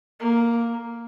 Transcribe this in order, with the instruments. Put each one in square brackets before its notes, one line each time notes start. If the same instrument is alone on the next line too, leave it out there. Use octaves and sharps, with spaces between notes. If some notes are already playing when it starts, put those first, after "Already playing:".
[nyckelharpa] A#3